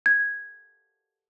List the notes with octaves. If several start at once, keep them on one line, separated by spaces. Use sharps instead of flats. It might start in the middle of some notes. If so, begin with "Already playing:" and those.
G#6